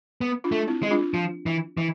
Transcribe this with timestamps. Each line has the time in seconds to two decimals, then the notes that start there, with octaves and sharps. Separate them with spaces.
0.21 B3
0.44 D4 F4
0.52 A3
0.68 C4 E4
0.83 G#3
0.91 D4 F4
1.14 F3
1.46 E3
1.77 E3